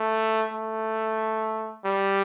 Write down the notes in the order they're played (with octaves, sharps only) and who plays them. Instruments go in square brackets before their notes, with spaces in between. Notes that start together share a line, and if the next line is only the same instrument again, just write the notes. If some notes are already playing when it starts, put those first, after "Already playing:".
Already playing: [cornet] A3
A3
G3